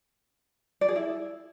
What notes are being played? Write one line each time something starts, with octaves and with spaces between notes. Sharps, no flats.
D5
G#4
E4